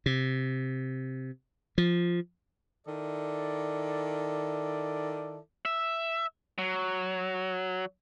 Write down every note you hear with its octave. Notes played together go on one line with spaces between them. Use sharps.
C3
F3
D#3 E4 A4 D5
E5
F#3